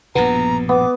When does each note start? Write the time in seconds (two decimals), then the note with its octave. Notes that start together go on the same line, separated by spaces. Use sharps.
0.15 A#1 G2 B2 B3 A#5
0.69 B3 D6